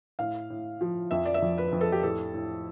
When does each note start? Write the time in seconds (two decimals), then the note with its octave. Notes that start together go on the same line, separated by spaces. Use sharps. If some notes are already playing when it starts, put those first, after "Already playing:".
0.19 A2 F5
0.50 A2
0.81 F3
1.11 F2 E5
1.25 D5
1.34 E5
1.42 F2
1.58 B4
1.72 F2
1.81 A4
1.92 G4
2.03 A2 A4
2.34 A2